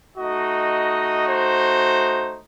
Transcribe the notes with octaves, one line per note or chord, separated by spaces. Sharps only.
A3 D#4 F#4 D#5
C5